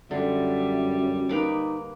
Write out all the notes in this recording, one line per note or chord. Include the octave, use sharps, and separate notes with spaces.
F#2 D3 G3 E5
A#3 D#4 B4 D6